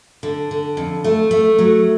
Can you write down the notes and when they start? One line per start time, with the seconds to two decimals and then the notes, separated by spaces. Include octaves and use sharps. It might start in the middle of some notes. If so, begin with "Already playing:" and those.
0.23 D3
0.51 D3
0.77 F2
1.04 A3
1.31 A3
1.59 F#3